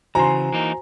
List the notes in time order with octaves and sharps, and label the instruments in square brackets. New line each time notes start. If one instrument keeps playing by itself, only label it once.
[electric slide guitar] C#3 E3 [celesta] F#4 C5 G#5 [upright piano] A#5 C6
[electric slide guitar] E3 A#3 D#4